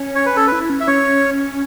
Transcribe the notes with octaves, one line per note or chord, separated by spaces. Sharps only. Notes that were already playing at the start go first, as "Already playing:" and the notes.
Already playing: C#4
C#5
B4
A4
B4
E4
C#4
E5
C#4 C#5